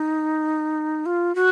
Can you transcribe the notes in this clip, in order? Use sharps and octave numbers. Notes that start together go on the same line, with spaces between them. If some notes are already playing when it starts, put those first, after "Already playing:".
Already playing: D#4
F4
F#4